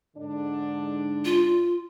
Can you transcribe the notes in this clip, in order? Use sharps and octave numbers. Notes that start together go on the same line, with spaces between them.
G#2 D3 D4
F4